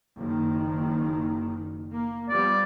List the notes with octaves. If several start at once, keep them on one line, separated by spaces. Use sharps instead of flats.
F#1 D#3
A#3
F3 G3 B3 D5